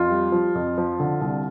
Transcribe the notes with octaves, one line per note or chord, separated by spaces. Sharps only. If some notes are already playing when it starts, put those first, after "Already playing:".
Already playing: F2 F4
G3
F3
F2
F3
D3
C2